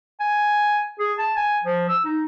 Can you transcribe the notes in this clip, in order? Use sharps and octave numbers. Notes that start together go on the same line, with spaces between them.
G#5
G#4
A5
G#5
F3
E6
D#4